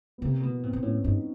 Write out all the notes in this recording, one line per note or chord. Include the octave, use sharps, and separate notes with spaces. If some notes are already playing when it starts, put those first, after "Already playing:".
B3
C3 A#3
B2 B3
A#2 C4
A#2
A2 C#4
G2 D#4